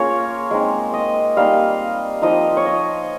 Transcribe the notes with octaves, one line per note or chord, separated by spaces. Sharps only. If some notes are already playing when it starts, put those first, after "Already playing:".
Already playing: A#3 C#4 F4 G#4 A#4 C#5
G#3 C4 D#4
D#5
G3 A#3 D#4 F5
F3 C4 D#4 D#5
C#5
D#5